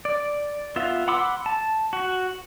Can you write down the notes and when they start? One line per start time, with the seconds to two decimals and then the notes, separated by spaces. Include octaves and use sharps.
0.05 D5
0.76 B3 F4 E5
1.08 F#5 B5 C6 D6 E6
1.46 A5
1.93 F#4